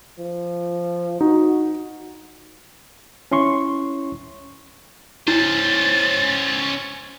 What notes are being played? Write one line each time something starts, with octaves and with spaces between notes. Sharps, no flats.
F3
D#4 F#4
C#4 E4 C6 C#6
C#4 E4 C5 A6